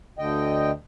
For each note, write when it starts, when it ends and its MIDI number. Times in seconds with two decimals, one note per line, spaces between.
0.18 0.71 38
0.18 0.71 50
0.18 0.71 75
0.18 0.71 79